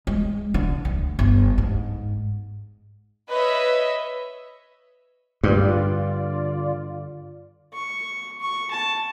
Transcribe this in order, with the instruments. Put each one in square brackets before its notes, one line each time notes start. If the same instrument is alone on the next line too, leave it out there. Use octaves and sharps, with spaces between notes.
[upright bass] G#3
D3
D2
G1
G#2
[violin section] B4 C#5 D#5 E5
[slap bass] G2 [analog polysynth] D3 F4 D5
[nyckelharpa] C#6
C#6
A5